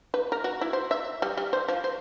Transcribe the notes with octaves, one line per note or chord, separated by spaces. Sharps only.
B4
A#4
F#4
E4
C5
E5
G3
G3
C5
F3
C5